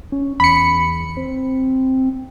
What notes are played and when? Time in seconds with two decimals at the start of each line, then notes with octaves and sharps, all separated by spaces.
0.12 C#4
0.40 E2 B5 C#7
1.17 C4